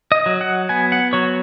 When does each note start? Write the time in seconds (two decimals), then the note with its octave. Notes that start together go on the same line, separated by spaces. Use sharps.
0.12 D#5
0.26 F#3
0.41 F#5
0.69 B3 G#5
0.92 F#5
1.13 F#3 C#5